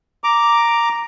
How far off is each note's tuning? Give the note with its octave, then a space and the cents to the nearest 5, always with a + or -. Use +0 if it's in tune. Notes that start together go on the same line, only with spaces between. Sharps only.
A#5 +0 D6 +0